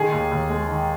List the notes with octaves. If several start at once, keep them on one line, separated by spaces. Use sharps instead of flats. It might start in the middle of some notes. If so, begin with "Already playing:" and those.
Already playing: D#3 G#4
D#2
D#2
G#3
D#3